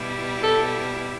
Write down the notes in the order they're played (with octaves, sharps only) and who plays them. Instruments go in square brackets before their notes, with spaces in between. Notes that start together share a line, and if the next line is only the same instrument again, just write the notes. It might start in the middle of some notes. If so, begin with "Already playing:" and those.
Already playing: [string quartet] B2 G3 E4
[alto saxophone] A4